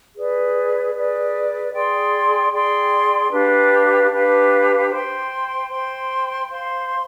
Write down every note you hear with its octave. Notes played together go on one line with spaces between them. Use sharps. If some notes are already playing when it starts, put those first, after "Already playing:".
G#4 B4 D5
G#4 B4 D5
G#4 D5 G5 C6
G#4 D5 G5 C6
D4 G4 B4 F5
D4 G4 B4 F5
C5 G5 C6
C5 G5 C6
C5 F5 C6